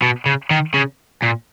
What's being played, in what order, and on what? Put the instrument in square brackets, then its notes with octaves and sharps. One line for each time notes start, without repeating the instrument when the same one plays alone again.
[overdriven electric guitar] B2
C#3
D#3
C#3
A#2